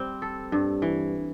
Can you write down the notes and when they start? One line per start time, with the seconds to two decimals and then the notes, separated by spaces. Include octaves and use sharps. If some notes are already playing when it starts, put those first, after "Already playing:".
Already playing: G3 C4
0.22 A4
0.52 G2
0.82 E3